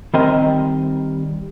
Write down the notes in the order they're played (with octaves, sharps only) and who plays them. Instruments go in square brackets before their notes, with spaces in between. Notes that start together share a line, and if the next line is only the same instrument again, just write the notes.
[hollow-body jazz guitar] D#3 G3 C4 A#4 D#5 C6